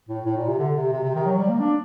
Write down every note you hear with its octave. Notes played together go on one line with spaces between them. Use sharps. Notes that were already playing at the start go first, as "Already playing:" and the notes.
A2
A2
A#2
C3
D3
C3
C3
C3
D#3
F#3
G3
A#3
D4